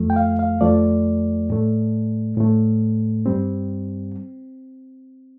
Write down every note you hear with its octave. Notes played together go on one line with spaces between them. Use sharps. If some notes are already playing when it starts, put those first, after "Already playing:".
Already playing: F2 F3 A3
G5
F5
F5
F2 F3 A3 D5
A2 A3
A2 A3
G2 G3 C4